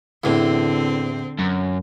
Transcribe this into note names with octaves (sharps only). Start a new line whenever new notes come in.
E2 A2 D3 C4
F#2